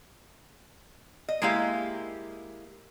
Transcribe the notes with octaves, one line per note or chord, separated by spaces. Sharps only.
D#5
G#3 A#3 E4 G4 F5